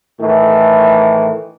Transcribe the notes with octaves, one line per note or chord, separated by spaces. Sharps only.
A2 D#3 E3